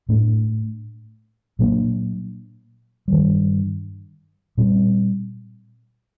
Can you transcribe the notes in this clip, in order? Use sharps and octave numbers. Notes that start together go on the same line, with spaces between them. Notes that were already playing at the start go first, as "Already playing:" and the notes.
A2 A3 D4
A#2 F#3 A#3 D4
G2 D#3 G3
A#2 G3 C4